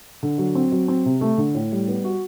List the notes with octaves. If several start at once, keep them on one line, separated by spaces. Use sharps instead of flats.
D3
F#3
C4
F#3
C4
C3
A3
D3
A2
G3
B3
F#4